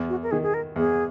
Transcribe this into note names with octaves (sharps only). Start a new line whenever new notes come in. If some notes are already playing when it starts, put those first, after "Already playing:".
Already playing: E2
F#4
A#4
D#3 G#4
G#4
A#4
E2 G#4